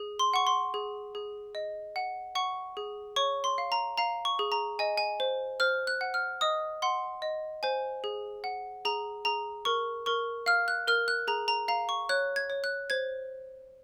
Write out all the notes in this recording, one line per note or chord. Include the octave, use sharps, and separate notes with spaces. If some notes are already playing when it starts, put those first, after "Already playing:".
Already playing: G#4
C6
F#5 C#6
C6
G#4
G#4
D#5
F#5
F#5 C#6
G#4
C#5 C#6
C6
F5
A#5
F5 A#5
C#6
G#4
A#5
D#5 G#5
G#5
C5
C5 F6
F#6
F#5
F6
D#5 D#6
F#5 C6
D#5
C5 G#5
G#4
F#5
G#4 A#5
G#4 A#5
A#4 C#6
A#4 C#6
F5 F6
F#6
A#4 F6
F#6
G#4 A#5
A#5
F5 A#5
C#6
C#5 F#6
G#6
C#5
F#6
C5 G#6